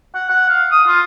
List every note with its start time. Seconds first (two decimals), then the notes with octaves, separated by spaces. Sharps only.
0.15 F#5
0.30 F#5
0.49 F5
0.72 D#6
0.88 F4